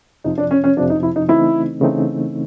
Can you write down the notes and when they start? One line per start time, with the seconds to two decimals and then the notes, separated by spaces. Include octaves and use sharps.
0.24 F2 C3 F3 D#4
0.38 D4
0.51 C#4
0.64 C#4
0.77 F2 C3 F3 D4
0.90 D#4
1.03 E4
1.16 D#4
1.29 C#3 E3 A3 C4 D#4 E4
1.81 C#3 E3 A3 C4 D#4